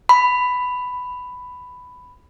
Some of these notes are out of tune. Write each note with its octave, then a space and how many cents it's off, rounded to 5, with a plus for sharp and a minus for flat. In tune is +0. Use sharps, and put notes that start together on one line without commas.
B5 +10